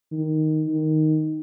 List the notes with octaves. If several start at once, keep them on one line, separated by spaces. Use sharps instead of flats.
D#3
D#3